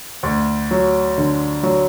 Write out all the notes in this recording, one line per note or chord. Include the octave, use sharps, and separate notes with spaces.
D2
F#3
D3
F#3